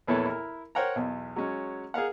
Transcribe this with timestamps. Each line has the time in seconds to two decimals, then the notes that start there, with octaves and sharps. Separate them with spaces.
0.08 A#1 E2 E3 E4 A4 C#5
0.26 E4 A#4
0.75 A#4 C5 C#5 F#5 G5 A#5
0.96 B1 E2
1.36 F#3 G#3 C#4
1.94 G#4 A#4 F5 F#5